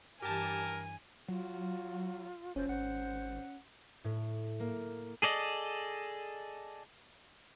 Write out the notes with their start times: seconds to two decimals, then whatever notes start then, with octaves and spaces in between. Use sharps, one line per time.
0.22 G2 E3 G4 A#4 G#5 A5
1.28 F#3 F4 F#4
2.56 F#1 F3 C#4 C5
2.69 G#1 C5 F#5
4.04 A2
4.60 A#3
5.22 G#4 A4 D5 D#5